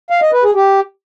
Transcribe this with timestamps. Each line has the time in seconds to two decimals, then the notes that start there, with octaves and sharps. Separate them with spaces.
0.10 F5
0.21 D#5
0.33 B4
0.44 G#4
0.55 G4